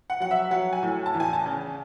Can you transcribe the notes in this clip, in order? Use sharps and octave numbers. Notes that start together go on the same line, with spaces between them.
F#5
F#3 F#5
E5
F#3 F#5
G#5
A2
A5
E2
G#5
A5
C#3